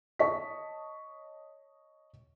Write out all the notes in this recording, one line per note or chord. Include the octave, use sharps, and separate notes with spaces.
C#5 D#5 A5 C#6 B6